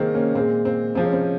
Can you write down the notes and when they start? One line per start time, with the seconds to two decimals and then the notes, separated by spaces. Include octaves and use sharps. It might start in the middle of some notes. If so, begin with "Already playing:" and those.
Already playing: C3 D#3 G#3 A#3 C4
0.14 A#3 C#4
0.34 A#2 G#3 C4
0.65 C4
0.95 C3 F3 G#3 C4
1.05 C#4
1.13 C4
1.21 C#4